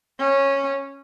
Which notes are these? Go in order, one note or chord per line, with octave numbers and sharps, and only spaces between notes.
C#4